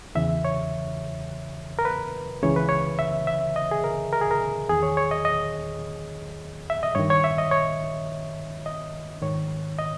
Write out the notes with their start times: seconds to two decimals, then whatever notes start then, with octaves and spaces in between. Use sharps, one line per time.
0.15 E2 C#3 E3 E5
0.45 C#5
1.79 A#4
1.85 B4
2.43 C#2 C#3 E3 C#5
2.56 B4
2.69 C#5
2.99 E5
3.27 E5
3.56 D#5
3.71 G#4
3.84 A#4
4.13 A#4
4.21 G#4
4.31 A#4
4.69 E2 D#3 G#4
4.83 C#5
4.97 C#5
5.11 D#5
5.25 D#5
6.70 E5
6.83 D#5
6.95 G2 D#3 C#5
7.10 C#5
7.24 E5
7.38 D#5
7.51 C#5
8.66 D#5
9.22 G#2 D#3 C#5
9.79 D#5